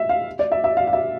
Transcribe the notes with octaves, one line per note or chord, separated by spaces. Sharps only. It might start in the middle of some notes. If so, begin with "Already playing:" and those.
Already playing: E5
F5
D5
E5
E5
F5
F5
E5